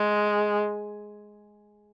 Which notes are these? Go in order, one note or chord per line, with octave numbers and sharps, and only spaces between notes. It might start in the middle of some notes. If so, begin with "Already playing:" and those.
Already playing: G#3